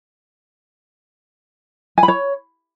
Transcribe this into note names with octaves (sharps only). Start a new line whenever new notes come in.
G#5
B5
C#5